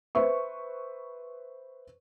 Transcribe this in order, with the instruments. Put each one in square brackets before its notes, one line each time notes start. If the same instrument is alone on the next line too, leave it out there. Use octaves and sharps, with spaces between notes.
[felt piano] B4 C5 E5 C#6